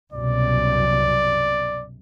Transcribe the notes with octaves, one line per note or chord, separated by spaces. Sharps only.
C2 F#2 B2 D5